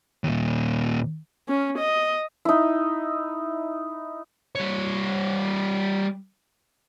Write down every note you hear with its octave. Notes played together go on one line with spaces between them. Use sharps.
D#2 A#2
C#4
D#5
D#4 E4
G3 C#5